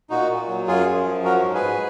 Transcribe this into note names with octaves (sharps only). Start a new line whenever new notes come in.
A#2 D#4 F#4
A#2
F#3
F#2 F4 G#4
F#2
F3
F#3 F#4 A#4
G#2
G#4 B4
G#2